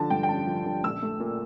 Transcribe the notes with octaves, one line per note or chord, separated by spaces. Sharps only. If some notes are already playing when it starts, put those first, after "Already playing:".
Already playing: D3 F3 A5
G2 G5
G5
A1 A5
F3
D3
A#1 E6
A3
A#2